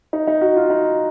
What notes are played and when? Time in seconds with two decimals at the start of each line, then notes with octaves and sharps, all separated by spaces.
0.13 D#4
0.27 D#4
0.41 F#4
0.56 F4
0.70 D#4